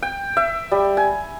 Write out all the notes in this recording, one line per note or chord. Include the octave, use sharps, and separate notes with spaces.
G5
E5
G3
G#5